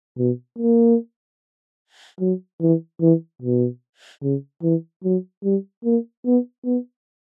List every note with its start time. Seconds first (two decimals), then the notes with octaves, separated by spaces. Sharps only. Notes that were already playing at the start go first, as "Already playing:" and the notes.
0.18 B2
0.59 A#3
2.20 F#3
2.61 E3
3.01 E3
3.42 B2
4.23 C#3
4.63 E3
5.04 F#3
5.44 G3
5.85 A#3
6.26 B3
6.65 B3